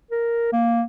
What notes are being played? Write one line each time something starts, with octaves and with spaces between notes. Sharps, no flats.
A#4
A#3